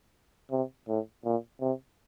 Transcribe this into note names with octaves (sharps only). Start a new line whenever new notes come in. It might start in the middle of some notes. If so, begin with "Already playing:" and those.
C3
A2
A#2
C3